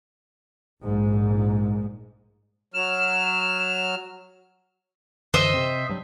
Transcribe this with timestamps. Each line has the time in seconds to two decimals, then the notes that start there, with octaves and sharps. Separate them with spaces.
0.83 A#1 G#2
2.74 F#3 F6 E7
5.34 F#2 D3 E3 C5 D#5 E5
5.54 C3 C4
5.89 G2 F#3